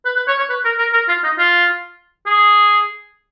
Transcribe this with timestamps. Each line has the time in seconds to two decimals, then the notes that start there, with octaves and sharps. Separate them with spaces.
0.05 B4
0.16 B4
0.28 C#5
0.38 C#5
0.50 B4
0.64 A#4
0.79 A#4
0.93 A#4
1.08 F4
1.23 D#4
1.38 F4
2.26 G#4